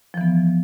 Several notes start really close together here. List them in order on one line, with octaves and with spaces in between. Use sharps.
F3 E3 B3